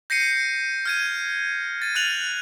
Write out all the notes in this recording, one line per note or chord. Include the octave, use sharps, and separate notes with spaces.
G6 A#6 C7 C#7 D#7
F6 G#6 D#7
A6 D#7
F6 F#6 D#7 F7 F#7